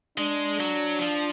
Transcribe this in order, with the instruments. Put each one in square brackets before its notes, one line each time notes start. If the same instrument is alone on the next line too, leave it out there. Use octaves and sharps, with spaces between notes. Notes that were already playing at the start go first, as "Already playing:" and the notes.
[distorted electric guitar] G#3 [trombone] D4
[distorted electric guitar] F#3
F3